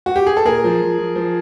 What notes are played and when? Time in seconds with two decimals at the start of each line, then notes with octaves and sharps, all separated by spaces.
0.06 F#4
0.16 G4
0.27 G#4
0.37 A4
0.46 A#2 G#4 A#4
0.64 F3
0.82 F3
0.98 F3
1.15 F3